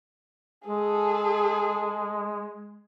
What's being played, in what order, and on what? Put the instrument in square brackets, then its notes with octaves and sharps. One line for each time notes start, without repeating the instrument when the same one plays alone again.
[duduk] G#3 [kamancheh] G#4 A4